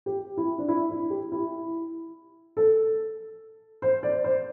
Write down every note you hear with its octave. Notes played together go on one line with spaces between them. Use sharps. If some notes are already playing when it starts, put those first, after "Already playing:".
G4
E4
D4
E4
E4
G4
E4
A4
C5
D5
C5